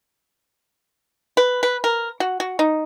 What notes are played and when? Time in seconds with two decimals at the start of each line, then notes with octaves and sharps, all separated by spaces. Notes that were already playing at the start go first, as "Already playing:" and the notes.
1.37 B4
1.63 B4
1.84 A#4
2.20 F#4
2.40 F#4
2.59 D#4